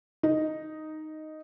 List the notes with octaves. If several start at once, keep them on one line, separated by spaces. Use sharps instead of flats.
D#4